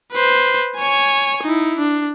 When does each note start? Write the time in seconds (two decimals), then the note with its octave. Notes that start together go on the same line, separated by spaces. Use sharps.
0.13 B4 C5
0.77 C#5 G#5
1.43 D#4 E4
1.79 D4